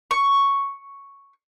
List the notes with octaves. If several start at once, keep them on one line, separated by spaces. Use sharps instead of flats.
C#6